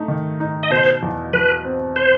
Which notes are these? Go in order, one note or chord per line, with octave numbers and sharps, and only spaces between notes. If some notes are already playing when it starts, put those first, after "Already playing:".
Already playing: A3 D#4
D#3
D#4
D#5
B2 C5
E2
E2 B4
C4
C5